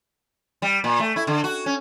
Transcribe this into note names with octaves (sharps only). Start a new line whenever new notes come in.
G3
A#2
A3
E4
D3
F#4
C#4